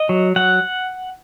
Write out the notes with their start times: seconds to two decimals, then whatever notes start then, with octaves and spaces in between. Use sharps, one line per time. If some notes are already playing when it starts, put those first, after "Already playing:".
Already playing: D#5
0.09 F#3
0.36 F#3 F#5